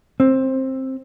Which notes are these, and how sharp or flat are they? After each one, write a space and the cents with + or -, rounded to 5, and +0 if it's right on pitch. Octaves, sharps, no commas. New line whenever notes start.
C4 +15